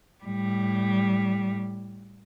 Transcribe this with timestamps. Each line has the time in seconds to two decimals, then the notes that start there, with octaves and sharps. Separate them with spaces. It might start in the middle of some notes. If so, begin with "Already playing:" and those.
0.24 A2 G3